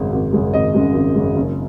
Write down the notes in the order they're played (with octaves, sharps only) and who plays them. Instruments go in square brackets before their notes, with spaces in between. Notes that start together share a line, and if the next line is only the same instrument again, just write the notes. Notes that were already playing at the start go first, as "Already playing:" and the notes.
Already playing: [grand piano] G#1 F#2 C#3 G#3
G#1
F#2 C#3 G#3
G#1 D#5
F#2 C#3 G#3
G#1
F#2 C#3 G#3
F#1